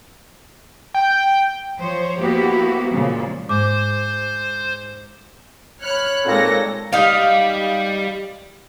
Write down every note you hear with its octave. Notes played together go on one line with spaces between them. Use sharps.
G5
F3 C5 C#5
F3 A#3 B3 E4 F#4 G4
A#2 C#3 F3 G#3
G#2 C5 D6
C#5 B5 F6 F#6
A#2 G#3 C4 D#4 A4 A#6
G3 D#4 F5